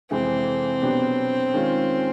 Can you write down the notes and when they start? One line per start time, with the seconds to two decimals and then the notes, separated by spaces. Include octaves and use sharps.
0.11 F2 C3 E3 G#3 C4
0.82 B2 F#3 B3 D4 G4
1.54 D#3 G#3 C#4 F4